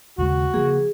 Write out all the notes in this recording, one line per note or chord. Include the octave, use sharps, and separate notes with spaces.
D#2 C#3 G#3 F#4
C#3 F3 A#3 G#4